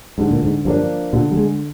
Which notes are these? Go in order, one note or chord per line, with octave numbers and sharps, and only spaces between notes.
G#2 D3
A#2
G#2
G2 F3 A#3 D4
A#2 D3
G3
G#3